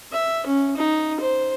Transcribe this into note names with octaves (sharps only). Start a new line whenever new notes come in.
E5
C#4
D#4
C5